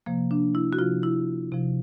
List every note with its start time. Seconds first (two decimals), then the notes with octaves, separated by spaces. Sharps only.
0.06 C3 F3 A#3
0.31 D4
0.55 E4
0.73 F#4
0.79 C3 F3 F4
1.03 E4
1.52 C3 F3